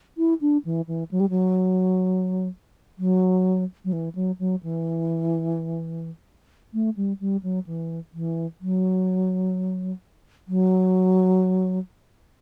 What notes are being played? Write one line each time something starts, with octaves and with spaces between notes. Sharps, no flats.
E4
D4
E3
E3
F#3
G3
F#3
F#3
F#3
E3
F#3
F#3
E3
A3
G3
G3
F#3
E3
E3
F#3
F#3